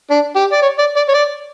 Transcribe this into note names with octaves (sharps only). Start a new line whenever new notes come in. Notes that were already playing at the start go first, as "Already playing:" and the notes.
D4
G4
D5
C#5
D5
D5
C#5
D5